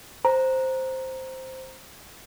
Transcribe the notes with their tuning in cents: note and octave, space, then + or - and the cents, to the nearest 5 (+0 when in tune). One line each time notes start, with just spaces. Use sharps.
C5 +0 A#5 +0